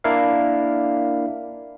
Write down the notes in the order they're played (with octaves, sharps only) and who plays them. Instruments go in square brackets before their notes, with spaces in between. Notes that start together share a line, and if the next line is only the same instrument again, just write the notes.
[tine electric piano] A#3 D4 E4 A#4 D5 F5